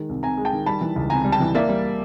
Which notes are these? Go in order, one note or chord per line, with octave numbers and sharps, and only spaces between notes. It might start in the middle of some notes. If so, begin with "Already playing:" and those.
Already playing: D#3 G#3
C2
C3 G#5 A#5
G#3
G5 A5
D#3
G3 A5 B5
E3
C#2
C3 G#5 A#5
G3
G5 A5
E3
A#3 D5 E5
G3